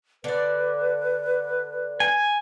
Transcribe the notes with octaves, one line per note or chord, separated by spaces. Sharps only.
D3 B4 D5
G#5